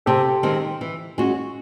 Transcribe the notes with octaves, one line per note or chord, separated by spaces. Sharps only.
C3 G4 A4
D#3 G#3 C4
E3
G#3 C#4 F#4